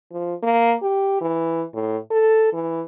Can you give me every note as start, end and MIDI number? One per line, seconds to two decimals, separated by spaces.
0.12 0.34 53
0.43 0.74 58
0.82 1.17 67
1.21 1.63 52
1.74 1.97 45
2.11 2.53 69
2.53 2.83 52